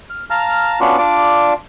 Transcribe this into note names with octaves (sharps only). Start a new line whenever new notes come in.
F6
F5 A5 A#5 F6
B3 C#4 D4 F4 F#4
D4 F4 D5